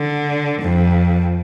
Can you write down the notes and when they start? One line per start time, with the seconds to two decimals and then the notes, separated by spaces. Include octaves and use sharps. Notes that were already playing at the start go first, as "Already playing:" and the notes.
Already playing: D3
0.62 F2